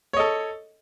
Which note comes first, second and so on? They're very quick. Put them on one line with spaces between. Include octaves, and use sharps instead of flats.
C#5 D#5 A4